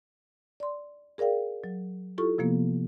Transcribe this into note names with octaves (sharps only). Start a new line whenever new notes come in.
D5 C6
G#4 A#4 D5 F5 G5
F#3
E4 F4 G4 A4 C#6
C3 F3 A#3 B3